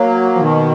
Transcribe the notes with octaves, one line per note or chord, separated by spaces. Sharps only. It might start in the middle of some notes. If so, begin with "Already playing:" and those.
Already playing: F#3 A#3
F3
B2 D#3